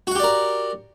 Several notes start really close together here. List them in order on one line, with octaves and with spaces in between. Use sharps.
F#4 F#5 G4 D5 A#4